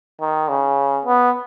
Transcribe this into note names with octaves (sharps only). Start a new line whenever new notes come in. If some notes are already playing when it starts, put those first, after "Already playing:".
D#3
C#3
B3